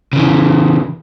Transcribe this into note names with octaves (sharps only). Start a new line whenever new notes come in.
C#3 E3